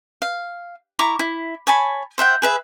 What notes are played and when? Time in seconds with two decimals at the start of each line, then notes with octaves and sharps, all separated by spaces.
0.22 F5
0.99 E4 A#5 C#6 D6
1.19 E4
1.67 C#5 G#5 A5 B5
2.18 C5 E5 F#5 G5
2.42 G#4 B4 E5